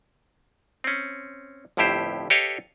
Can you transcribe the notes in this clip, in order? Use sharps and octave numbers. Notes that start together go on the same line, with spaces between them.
C4 C#4
G1 F2 A2 E4 G4 C5
G4 A4 B4 C#5 D#5 F5